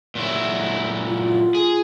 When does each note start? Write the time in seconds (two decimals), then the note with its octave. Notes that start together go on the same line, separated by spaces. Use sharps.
0.15 A#2 F#3 E4
1.07 F4
1.55 G#4